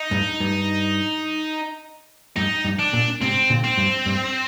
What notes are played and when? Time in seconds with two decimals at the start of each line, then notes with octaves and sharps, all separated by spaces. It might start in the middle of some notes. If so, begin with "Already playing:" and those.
Already playing: D#4
0.11 G2
0.40 G2
2.36 G2 D#4
2.65 G2
2.79 D4
2.93 A#2
3.21 G#2 C3 C4
3.50 A#2 D3
3.64 C4
3.77 G2
4.06 G2